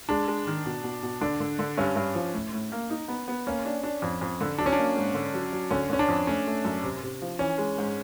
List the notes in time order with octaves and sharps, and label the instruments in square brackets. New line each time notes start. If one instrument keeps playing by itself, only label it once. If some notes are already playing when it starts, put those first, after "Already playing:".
[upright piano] G#3 [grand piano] D4
[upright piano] G#3
D#3
B2
B2
B2
[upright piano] D3 [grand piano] D4
[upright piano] D3
D3
[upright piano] G2 [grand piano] C#4
[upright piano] G2
F3
A2
A2
A#3
D#4
B3
B3
[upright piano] A#3 [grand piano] C#4
[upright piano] D4
D4
F2
F2
D3
[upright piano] F#3 [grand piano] D4
[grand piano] C#4
D4
[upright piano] A#3
G#2
D3
F#3
F#3
[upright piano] D3 [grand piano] C#4
[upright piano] D3 [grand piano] C#4
[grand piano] D4
[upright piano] F2
[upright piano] A3 [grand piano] C#4
[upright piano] A3
F#2
C3
C3
F3
[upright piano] E3 [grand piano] C#4
[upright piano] G#3
G#2